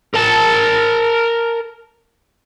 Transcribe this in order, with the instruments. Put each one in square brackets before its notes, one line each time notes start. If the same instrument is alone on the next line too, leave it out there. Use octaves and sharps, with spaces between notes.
[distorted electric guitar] A#4 A5